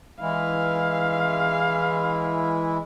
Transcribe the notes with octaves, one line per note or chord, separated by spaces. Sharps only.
E3 G#3 E4 F5